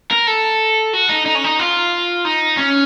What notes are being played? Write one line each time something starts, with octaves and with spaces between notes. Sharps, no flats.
A#4
A4
F#4
D#4
D#4
C#4
D#4
F4
D#4
C#4